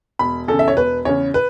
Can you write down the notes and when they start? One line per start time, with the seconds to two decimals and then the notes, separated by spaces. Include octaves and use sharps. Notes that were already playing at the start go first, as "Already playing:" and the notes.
0.19 E1 B5
0.48 E2 C#3 A4
0.59 E5
0.68 C#5
0.77 E1 B4
1.05 E2 C#3 C#5
1.34 B4